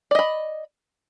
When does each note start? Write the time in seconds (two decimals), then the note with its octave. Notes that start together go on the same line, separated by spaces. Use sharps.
0.11 D5
0.15 D#5
0.19 B5